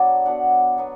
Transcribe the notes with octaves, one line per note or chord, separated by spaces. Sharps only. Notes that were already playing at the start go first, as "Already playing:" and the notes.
Already playing: F#3 B3 D4 D5
F#3 B3 D4 F#5
F#3 B3